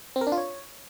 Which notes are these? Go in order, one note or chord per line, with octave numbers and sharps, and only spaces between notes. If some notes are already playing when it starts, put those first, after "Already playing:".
C4
A#4
D4
F4
C#5